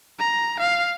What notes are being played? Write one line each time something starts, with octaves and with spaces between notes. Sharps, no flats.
A#5
F5